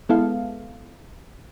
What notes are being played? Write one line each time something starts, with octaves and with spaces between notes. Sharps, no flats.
G#3 B3 E4 A4 F5